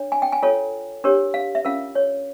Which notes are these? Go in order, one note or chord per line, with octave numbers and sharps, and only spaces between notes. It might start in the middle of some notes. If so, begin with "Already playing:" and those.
Already playing: D4 C#5
G#5
G5
G#5
F4 A4 C#5
D4 G4 A#4 C#5
F5
E5
C#4 F4 A#4 F5
C#5